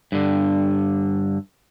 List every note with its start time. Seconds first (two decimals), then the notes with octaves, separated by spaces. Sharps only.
0.12 G2 D3